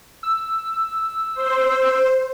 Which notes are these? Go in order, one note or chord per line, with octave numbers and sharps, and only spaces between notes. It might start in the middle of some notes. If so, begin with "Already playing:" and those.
E6
C5